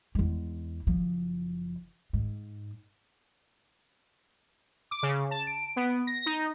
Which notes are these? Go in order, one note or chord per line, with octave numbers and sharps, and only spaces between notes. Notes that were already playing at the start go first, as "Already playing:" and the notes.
E2 G#3
F#1 F3
G#2
D6
C#3
A5
D7
B3
A#6
D#4